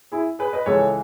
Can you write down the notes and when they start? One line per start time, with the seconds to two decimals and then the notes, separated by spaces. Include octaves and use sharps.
0.12 E4 G#4
0.39 G#4 B4
0.53 B4 D#5
0.66 C#2 C#3 E3 G#3 A4 C#5